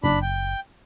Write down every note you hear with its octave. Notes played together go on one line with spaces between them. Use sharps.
F#1 D4 B5
G5